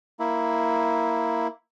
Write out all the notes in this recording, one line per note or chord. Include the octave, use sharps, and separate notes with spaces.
A#3 E4